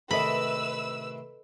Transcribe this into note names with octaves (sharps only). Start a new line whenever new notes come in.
A2 C3 D#3 A4 B4 D#5 B5 E6